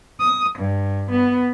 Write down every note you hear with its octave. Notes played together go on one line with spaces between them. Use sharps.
D#6
G2
B3